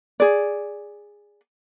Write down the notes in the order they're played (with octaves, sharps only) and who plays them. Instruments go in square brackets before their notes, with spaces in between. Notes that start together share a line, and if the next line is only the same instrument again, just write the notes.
[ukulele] G#4 D5